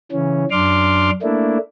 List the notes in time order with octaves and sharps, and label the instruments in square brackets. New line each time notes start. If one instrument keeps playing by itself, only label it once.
[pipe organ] C#3 E3 C#4
F#2 D4 C6 D6 F6
A3 A#3 D4 E4